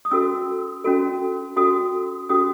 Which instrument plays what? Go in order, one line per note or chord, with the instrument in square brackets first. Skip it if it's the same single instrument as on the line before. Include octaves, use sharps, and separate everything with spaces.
[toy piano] D#6
C#4 F#4 A4 E6
C#4 F#4 A4
C#4 F#4 A4 D#6
C#4 F#4 A4 D#6